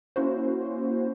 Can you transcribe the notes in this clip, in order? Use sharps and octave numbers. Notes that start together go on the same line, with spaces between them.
A#3 C#4 E4 F#4 C5